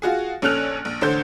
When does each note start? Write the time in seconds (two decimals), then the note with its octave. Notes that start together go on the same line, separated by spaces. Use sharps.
0.02 F4 F#4 G#4
0.42 A#1 C#4 A4 F6 F#6 F7
0.85 A#1
1.01 A1 D3 C5 G6